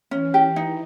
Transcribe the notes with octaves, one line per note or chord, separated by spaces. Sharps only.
E3 C#4
G4
D#4